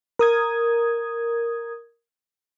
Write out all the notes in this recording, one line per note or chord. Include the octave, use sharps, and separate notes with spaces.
A#4 D#6 G#6